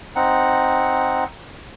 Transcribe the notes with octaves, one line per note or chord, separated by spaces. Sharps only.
C4 D#4 F#5